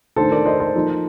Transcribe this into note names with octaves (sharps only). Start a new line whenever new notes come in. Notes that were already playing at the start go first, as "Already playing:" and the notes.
D#3 A3 D4 A4 C5
A#4 D5
C5 D#5
A4 C5
F3 A#3 D#4